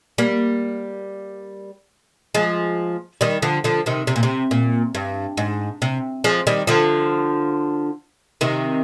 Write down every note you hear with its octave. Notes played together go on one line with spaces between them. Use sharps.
G3 A#3
F3 G#3
D#3 G3
D3 F3
D3 F3
C3 D#3
C3
A#2
C3
A#2
G2
G#2
C3
F3 G#3
D#3 G3
D3 F3
C3 D#3